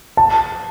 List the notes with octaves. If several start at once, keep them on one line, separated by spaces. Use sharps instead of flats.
A5